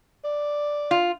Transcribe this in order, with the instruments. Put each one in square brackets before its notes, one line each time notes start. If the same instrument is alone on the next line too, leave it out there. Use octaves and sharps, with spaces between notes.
[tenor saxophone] D5
[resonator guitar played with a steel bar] F4